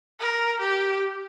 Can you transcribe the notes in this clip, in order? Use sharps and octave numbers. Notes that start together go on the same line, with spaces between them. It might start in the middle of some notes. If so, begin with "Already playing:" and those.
A#4
G4